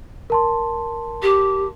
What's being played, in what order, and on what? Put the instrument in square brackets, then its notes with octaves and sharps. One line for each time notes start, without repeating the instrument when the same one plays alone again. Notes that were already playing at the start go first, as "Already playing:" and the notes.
[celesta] A#4 A5 C6
[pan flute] G4